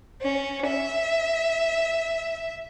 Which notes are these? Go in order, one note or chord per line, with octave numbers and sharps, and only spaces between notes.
C#4
E5